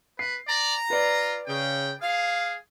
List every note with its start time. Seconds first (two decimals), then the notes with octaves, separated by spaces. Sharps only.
0.19 B4 C7
0.47 D5 A#5
0.90 F4 B4 D5
1.47 C#3 G5
2.02 G#4 F5